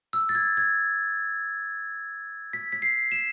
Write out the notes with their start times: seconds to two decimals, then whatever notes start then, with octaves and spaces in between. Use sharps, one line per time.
0.13 E6
0.29 A6
0.35 G#6
0.57 G#6
2.53 B6
2.73 B6
2.82 C7
3.12 E7